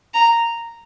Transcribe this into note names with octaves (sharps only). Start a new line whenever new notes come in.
A#5